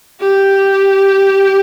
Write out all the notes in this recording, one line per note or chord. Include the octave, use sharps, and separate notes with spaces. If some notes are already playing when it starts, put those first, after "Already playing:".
G4